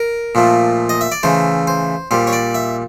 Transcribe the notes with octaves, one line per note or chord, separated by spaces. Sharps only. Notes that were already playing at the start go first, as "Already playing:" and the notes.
Already playing: A#4
A#2 F3 A3
D#5
E5
D5
C#3 E3 A3 C5
C5
A#2 G3 C5
C#5
D5
E5